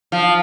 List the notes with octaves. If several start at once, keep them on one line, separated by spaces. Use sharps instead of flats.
F3